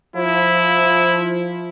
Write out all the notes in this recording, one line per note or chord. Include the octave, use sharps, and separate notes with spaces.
F3 E4